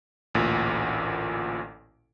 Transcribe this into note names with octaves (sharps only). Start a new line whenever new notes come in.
A1 D2 A#2